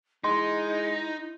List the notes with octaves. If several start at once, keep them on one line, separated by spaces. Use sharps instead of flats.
G#3 D#4 E4 C6